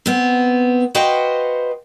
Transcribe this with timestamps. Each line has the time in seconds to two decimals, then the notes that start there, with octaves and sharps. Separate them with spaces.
0.06 B3 C4
0.95 F#4 B4 C5 D#5 F5 G5